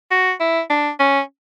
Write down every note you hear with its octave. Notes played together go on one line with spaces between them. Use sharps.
F#4
E4
D4
C#4